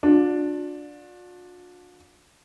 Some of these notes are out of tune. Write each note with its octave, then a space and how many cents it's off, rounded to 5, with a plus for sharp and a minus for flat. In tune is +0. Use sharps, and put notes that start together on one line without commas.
D4 +0 F4 +45